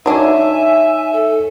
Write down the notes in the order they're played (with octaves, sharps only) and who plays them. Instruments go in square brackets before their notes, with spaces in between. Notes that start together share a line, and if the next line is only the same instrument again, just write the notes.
[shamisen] F#3 D4 [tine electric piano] D#4 C#5 [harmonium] E5 [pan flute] G#5
[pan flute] A4